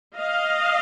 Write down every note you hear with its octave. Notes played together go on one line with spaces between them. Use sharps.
D#5 F5